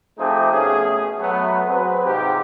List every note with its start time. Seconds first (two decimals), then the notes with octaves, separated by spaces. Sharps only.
0.18 F3 A3 C4 D#4 G4 G#4
0.53 B2 A3 C#4 G#4
1.19 F#3 A3 B3
1.68 F#3 C4 G#4 B4
2.06 G#2 C3 F3 G4